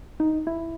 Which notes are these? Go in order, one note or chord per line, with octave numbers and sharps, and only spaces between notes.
D#4
E4